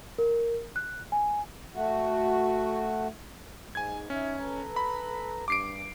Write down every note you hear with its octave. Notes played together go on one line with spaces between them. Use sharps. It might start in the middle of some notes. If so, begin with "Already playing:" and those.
A#4
F#6
G#5
A3 F#4
G#2 G#5 G#6
C#4 D#4 E5
A4 B4 A#5
B5
G2 D6 C7 D7